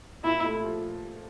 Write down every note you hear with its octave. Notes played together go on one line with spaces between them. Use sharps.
A#2 E4
A3
F3